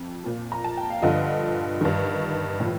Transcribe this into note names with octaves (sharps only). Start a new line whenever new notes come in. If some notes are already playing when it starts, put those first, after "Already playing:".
Already playing: F2
A#2 F3
A#5
A5
G5
F5
G2 D3 F3 D#5
G2 D#3
A2 F3